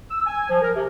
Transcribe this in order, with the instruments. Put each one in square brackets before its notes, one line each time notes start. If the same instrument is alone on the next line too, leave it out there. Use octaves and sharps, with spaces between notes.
[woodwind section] E6
G#5
F3
A#4
C3